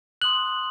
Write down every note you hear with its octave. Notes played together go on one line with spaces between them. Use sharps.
C6 D#6 F#6 F#7